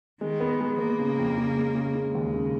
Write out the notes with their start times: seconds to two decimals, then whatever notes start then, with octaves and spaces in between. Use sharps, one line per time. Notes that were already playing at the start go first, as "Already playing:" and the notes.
0.21 D#3 G#3
0.40 B3
0.61 G#3
0.79 A#3 B3
0.99 C#3
1.18 F2
1.38 C#3
1.57 G#3
1.75 C#3
1.95 C#3 G#3
2.15 D#2
2.34 C#3